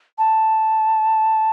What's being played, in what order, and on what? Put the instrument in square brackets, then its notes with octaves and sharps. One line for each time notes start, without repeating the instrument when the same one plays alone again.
[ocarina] A5